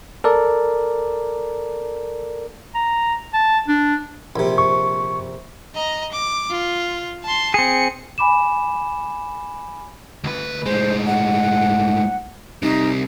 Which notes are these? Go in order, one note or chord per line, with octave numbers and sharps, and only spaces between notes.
A4 A#4 D5
A#5
A5
D4
A#1 C3
C#6
D#5 A#5
D6
F4
A5 C6
C4 G#4 C#7
G#5 B5 D6 E7
D2 B4
A2 G#3 C5
F#5
C2 C3 D#4